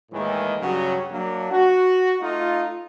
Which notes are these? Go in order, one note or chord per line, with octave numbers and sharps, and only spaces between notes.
D#2 A2 D#3 E3 G#3
G2 C#3 F#3 G3 F#4
F#3 A#3 D4
F#4
A3 D#4 F4